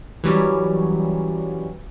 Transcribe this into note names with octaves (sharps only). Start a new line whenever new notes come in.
E3 F#3 G3 C#4